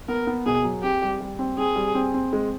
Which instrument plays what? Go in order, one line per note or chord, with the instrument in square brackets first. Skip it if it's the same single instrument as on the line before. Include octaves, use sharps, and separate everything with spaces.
[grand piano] B3 [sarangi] A#4
[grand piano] B3
[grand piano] B2 [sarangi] G#4
[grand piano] F#3
[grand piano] C4 [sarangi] G4
[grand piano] G3
G3
C4
[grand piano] C4 [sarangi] G#4
[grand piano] G3
C4
C4
G#3